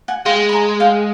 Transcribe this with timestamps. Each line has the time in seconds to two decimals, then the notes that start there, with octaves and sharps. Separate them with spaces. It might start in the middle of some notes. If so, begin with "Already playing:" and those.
0.08 F#5 G#5
0.25 G#3 F5 G5
0.49 B5
0.53 G#5 A#5
0.80 F5 G5